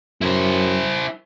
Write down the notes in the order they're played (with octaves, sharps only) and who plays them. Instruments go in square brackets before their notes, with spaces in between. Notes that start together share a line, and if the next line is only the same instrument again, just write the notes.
[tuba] F#2 [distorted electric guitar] E4 C5